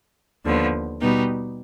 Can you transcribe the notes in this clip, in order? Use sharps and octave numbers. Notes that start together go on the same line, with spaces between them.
D#2 D3 F3 B3
B2 G3 B3 D#4 G4